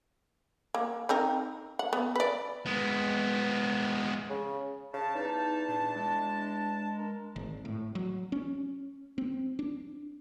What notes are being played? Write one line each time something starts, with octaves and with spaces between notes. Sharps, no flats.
A#3
C4 D#4 A#4
F#5
B3
B4 D5
G#3 B3
C#3
C#3 A5
E2 D#4
A#2 D4
G#3
A#4
G#1
A2
F#3
C#4
C4
D4